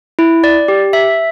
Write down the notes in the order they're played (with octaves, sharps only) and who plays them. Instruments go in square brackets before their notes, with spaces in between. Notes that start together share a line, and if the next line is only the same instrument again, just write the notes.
[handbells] E4
D5
G4
E5